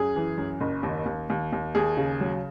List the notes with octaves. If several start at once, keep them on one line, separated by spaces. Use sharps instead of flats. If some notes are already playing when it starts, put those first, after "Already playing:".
Already playing: F#2 G#4
E3
F#2
F#1
D#2
D#2
D#2
D#2
D#2 G#4
C#3
F#3